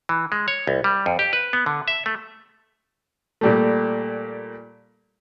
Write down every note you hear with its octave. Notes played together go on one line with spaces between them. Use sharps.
E3
G#3
C#5
C2
G3
F2
G4
B4
B3
D3
E5
A3
A#2 G3 A3